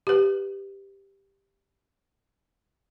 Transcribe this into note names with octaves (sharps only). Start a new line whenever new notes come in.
G4 B4